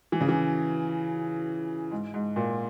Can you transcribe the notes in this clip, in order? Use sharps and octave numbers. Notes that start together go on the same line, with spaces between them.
E3
C#3
E3
G#2
G#2
A#2